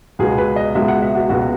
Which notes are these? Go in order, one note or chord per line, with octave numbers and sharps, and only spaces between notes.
C#2 B2 G#3 B3 G#4
B4
D#5
C#2 B2 G#3 B3 E5
F#5
E5
F#4
C#2 B2 G#3 B3 F#4